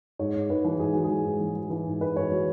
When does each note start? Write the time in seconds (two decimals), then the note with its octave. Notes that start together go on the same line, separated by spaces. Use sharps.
0.19 G#2 C#5
0.35 G#2
0.50 G#2 B4
0.65 E3
0.80 G#2 G#4
0.92 E3 F#4
1.04 G#4
1.10 E3
1.25 G#2
1.40 E3
1.56 E3
1.70 E3
1.86 G#2
2.01 G#2 B4
2.16 G#2 C#5
2.32 E3 F#4